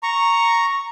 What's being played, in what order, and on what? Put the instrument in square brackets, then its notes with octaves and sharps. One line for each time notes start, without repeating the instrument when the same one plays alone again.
[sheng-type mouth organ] A#5 C#6